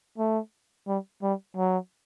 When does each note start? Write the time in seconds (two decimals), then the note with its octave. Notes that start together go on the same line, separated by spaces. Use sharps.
0.18 A3
0.87 G3
1.23 G3
1.57 F#3